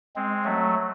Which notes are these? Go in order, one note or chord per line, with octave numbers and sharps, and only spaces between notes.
G#3 C4
F#3 A3